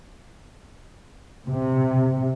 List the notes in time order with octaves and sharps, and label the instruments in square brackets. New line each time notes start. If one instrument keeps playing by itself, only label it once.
[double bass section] C3